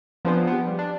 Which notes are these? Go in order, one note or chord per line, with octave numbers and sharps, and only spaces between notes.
F3 B3 C4 D4 G#4 C5
B3 G4
G3
D4